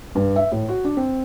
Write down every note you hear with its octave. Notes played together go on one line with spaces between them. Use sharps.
G2
E5
A2
F#4
D4
C4